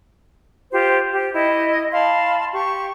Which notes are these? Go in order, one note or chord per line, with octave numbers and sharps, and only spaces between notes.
F4 G4 C5
G4
E4 D#5
F5 A5 B5 C6
G4 C#6